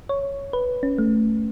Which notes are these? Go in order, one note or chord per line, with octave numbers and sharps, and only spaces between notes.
C#5
B4
C#4
A3